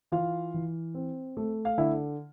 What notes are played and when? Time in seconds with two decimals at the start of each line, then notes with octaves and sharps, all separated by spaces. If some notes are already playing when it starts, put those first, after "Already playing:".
0.12 E3 F4 F5
0.54 E3
0.95 C4
1.37 A3
1.65 F5
1.78 D3 E4 E5